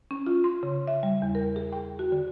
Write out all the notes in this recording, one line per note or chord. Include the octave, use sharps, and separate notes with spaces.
C#4
F4
C6
C#3
E5
G3
E2
A#4
G#4
G5
F#4
D3